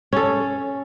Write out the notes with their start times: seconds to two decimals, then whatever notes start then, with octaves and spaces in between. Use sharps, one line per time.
0.13 C#4 A4